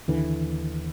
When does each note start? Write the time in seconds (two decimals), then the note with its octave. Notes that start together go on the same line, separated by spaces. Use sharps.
0.08 D#2 D3 E3